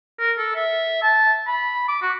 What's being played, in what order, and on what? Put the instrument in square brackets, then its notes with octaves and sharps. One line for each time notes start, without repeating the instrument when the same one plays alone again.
[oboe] A#4
A4
E5
A5
B5
D6
F#4